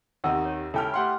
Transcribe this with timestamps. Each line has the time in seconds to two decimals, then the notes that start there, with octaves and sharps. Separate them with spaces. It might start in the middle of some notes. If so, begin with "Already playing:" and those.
0.24 D#2 C3 D#3 D#4 F#5 E6
0.45 C#5
0.74 C#2 E4 G4 A4 G5 F6
0.94 A3 G4 F#5 C6